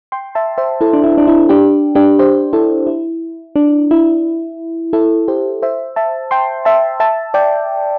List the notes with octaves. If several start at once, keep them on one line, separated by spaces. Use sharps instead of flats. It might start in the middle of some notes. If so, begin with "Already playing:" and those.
G5 C6
E5 A5
C5 E5
E4 A4
D4
E4
D4
E4
D4 G4
D4 G4
G4 C5
E4 A4
E4
D4
E4
E4 A4
G4 C5
C5 E5
E5 A5
G5 C6
E5 A5
E5 A5
D5 G5